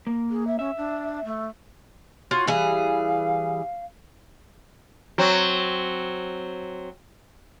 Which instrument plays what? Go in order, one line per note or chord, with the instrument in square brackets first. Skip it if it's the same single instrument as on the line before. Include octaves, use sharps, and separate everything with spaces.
[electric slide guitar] A#3
[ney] G#4
E5
[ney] C#4 [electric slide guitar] E5
[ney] D4
A3
[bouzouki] F4 F#4 C#5
[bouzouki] E3 G3 G#4 [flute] F5
[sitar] F#3 C4